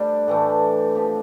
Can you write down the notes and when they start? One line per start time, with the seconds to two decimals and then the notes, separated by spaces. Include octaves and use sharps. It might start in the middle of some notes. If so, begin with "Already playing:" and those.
Already playing: G3 A3 D4 G4 C5 D5
0.28 A2 E3 A3
0.95 F3 C4 G4